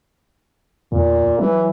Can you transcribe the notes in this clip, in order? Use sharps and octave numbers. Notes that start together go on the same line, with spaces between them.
E2 A#2
E3 F#3